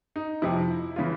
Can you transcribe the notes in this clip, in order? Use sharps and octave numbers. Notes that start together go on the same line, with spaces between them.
D#4
F2 C3 F3 E4
C#3 E3 F4